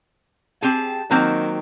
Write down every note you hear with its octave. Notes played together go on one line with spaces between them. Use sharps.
C4 G4 G#4 A5
D#3 F#3 A#3 C4